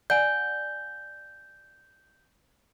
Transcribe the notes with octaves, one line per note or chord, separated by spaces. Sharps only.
D5 F#5 G#5 G6